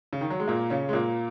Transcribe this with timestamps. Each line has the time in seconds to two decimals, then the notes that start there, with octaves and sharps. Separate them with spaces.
0.13 C#3
0.21 D#3
0.30 F#3
0.40 G#3
0.48 A#2 A#3
0.70 C#3 C#4
0.89 G#3
0.93 A#2 A#3